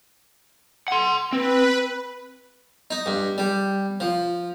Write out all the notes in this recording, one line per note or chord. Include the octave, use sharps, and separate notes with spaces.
F#5 C6
C4 B4
D#4
G2
G3
F3